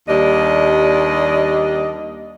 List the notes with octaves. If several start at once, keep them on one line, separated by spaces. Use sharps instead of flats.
D#2 G3 D4 D#5